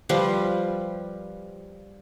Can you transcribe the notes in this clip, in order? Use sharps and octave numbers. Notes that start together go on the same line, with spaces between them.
F3 G3 F4 B4